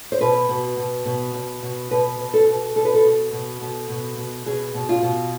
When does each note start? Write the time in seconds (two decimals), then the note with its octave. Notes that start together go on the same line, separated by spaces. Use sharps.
0.12 C5
0.21 B2 B4
0.49 B2
0.77 B2
1.05 B2
1.34 B2
1.63 B2
1.91 B2 B4
2.19 B2
2.34 A4
2.48 B2
2.76 B2 A4
2.85 B4
2.95 A4
3.04 B2
3.33 B2
3.61 B2
3.89 B2
4.17 B2
4.46 B2 G#4
4.74 B2
4.89 F4
5.02 B2